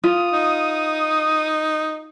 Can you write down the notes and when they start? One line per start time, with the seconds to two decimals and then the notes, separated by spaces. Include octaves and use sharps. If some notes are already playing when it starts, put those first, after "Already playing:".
0.04 F4 D#6
0.33 D#4